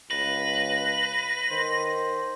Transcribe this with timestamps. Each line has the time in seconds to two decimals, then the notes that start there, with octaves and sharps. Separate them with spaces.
0.11 C#2 B4 A#6
1.50 D#3 C5